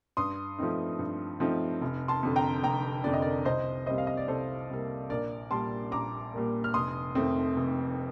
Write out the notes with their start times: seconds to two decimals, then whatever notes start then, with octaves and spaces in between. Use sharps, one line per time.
0.17 G2 C6 D#6
0.59 F3 A3 C4 D#4
0.99 G2
1.40 F3 A3 C4 D#4
1.81 F1
2.08 A5 C6
2.23 F2 D3
2.36 G5 A#5
2.63 F1 G5 A#5
3.04 F2 D3 D5
3.14 D#5
3.22 A#4 D5
3.45 C2 C5 D#5
3.86 C3 G3 A#3 C5 D#5
3.98 F5
4.07 D#5
4.17 D5
4.28 C2 A4 C5
4.69 C3 G3 A#3
5.10 A#1 A#4 D5
5.50 A#2 G3 A#3 A5 C6
5.92 A#1 A#5 D6
6.33 A#2 G3 A#3
6.64 F6
6.74 F1 C6 D#6
7.15 F2 D#3 A3 C4
7.56 F1